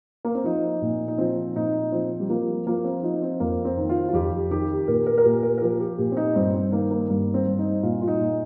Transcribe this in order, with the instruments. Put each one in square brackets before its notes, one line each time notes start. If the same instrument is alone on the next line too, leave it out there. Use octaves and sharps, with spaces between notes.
[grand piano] A#3
C4
F3 D#4
A#2
D#4
F3 C4
A#2 D#4
F3 C4
G3
F3 A#3
F3 A#3
C4
F3 D#4
C4
F2 A#3
C4
D#3
F4
F4
F2 G4
D#3 G4
A#2 A#4
A#4
A#4
A#2 G4
A#4
A#4
F3 G4
G4
A#2 G4
C4
D#4
G2 C4
C4
D#3 A#3
A#3
G2 A#3
C4
G2
D#4
A#2 F4
F4
D#4
A#2